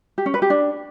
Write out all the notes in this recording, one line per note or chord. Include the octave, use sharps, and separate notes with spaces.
G4
C#4
B4
G4
D4